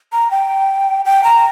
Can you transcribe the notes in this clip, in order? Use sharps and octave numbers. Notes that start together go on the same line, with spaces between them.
A#5
G5
G5
A#5